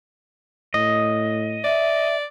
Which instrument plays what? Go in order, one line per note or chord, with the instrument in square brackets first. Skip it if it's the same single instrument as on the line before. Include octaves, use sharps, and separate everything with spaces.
[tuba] A2 [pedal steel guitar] D#5
[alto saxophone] D5 [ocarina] E5